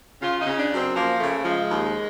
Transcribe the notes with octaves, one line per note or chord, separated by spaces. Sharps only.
C#3 F4
D#4
C#3
D4
F#2
C4
F3 A#3
C#3 A3
F3 G#3
D#2